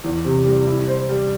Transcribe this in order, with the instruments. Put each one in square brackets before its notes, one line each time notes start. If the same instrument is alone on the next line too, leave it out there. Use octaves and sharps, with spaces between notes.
[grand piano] E2
C3
G3
E4
C5
G3